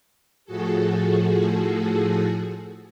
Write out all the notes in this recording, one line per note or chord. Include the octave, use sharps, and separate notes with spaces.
A2 F3 F#4 G#4 A4